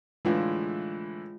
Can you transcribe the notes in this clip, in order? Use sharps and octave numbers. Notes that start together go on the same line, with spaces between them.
A2 D3 E3 G#3 F4